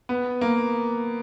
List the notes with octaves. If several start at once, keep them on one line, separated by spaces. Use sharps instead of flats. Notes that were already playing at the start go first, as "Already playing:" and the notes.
B3
A#3